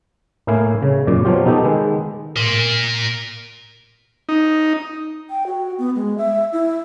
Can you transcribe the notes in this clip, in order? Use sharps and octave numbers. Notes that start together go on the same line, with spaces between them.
A2 A#3 E4 F5 G#5
C#3
F#2 A#2 D5
B2 F3 F#3 F4 G4
B3 D#4 G4 A4
D#3 G#3 B4
A#4 C6
D#4
G5
F#4
B3
G#3
E5
E4